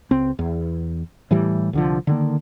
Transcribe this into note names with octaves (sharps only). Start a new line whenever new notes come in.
C#2 C4
E2
A2 E3 G3
C2 D3 F3
D3 D#3 A#3